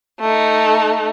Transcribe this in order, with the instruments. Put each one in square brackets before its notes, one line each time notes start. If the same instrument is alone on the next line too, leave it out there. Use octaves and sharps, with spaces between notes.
[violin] A3 D#4